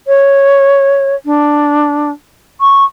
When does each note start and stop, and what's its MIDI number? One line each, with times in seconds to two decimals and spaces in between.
0.07 1.15 73
1.25 2.10 62
2.60 2.84 85